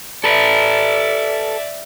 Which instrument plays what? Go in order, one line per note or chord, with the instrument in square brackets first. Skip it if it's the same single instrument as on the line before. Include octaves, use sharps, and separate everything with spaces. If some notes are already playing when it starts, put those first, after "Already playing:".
[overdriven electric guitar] A4 B4 [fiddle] D5 E5